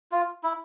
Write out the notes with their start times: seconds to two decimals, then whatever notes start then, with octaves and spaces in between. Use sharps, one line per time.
0.12 F4
0.43 E4